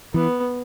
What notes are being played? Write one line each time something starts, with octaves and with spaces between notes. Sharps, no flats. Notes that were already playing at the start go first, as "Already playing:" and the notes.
E3 B3